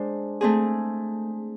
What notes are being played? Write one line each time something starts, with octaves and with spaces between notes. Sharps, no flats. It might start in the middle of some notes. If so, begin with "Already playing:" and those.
Already playing: G#3 D4 C5
A3 C4 G#4